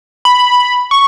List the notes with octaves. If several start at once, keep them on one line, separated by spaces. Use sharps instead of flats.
B5
C#6